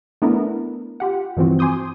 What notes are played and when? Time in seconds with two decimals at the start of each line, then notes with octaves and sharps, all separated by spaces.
0.22 A3 B3 D4 E4 A#4
1.00 F4 G4 F#5
1.37 G2 E3 F3 C4 F#4
1.59 G#5 C6 D6 D#6 G6